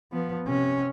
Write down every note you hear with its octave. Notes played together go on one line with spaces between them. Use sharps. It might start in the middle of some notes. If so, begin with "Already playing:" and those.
F3 B3
C3 C#4